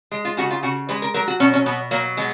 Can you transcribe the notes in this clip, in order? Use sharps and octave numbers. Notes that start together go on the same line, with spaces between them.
G#3
F4
C#3 F#4
F4
C#3 F#4
G#3 B4
A#4
F#3 A#4
F#4
B2 C#4
C#4
B2 B3
F#3 A#3
G#3 B3